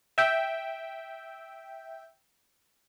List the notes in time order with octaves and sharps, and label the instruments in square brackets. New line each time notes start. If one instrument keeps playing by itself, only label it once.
[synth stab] E5 G5